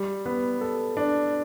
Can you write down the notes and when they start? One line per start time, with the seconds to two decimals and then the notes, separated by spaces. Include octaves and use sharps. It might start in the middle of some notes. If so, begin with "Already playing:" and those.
Already playing: G3
0.26 B3
0.61 A4
0.97 D4